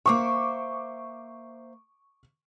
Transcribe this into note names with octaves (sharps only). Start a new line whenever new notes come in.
A#3 C5 E5 C#6 D6